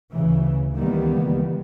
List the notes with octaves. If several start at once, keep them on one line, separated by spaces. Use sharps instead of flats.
D2 C#3 E3
C#2 D#3 E3 G3 A#3 B3